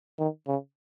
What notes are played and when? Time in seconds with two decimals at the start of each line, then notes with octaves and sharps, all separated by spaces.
0.19 D#3
0.48 C#3